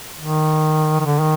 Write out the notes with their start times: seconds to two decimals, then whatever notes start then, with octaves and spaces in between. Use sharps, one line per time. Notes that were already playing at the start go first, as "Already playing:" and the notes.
0.20 D#3
1.01 D#3
1.06 D3
1.20 D#3